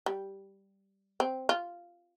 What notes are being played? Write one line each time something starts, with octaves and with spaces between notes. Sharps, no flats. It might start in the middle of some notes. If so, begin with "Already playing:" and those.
G3
C4
F4